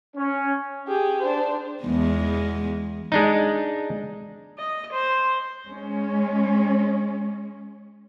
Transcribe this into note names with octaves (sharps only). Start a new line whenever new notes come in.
C#4
G4 G#4
D4 C5
E2 G#3 B3
G#3 D4 D#4
D#5
C5
G#3 C#4